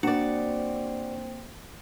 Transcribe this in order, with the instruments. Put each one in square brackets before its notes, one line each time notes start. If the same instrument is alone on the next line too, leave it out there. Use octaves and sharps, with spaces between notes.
[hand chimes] A#3 [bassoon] C4 [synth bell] D4 C#7 [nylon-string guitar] F#4 D5